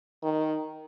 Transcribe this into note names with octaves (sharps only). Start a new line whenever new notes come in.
D#3